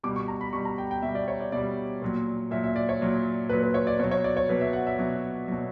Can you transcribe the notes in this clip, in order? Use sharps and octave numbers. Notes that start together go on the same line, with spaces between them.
B2 G3 D6
C#6
A#5
B5
B2 G3 C#6
A#5
G5
G5
B2 G3 E5
D5
C#5
D5
B2 G3 D5
A#2 F#3
A#2 F#3 E5
E5
D5
C#5
A#2 F#3
A#2 F#3 B4
B4
C#5
D5
B2 F#3 C#5
C#5
D5
C#5
B2 F#3 B4
E5
F#5
E5
B2 F#3
B2 F#3